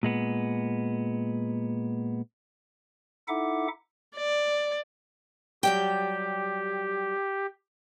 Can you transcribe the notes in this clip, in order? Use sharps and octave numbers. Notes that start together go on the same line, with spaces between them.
A#2 G#3 B3
D#4 E4 A4 E5 F#5 D6
D5
F#3 G3 G4 G5